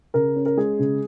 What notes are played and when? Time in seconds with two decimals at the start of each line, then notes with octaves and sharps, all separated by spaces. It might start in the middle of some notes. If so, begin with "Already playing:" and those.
0.14 C#3 A#4
0.36 C#4
0.46 A#4
0.57 G#3 G#4
0.79 C#3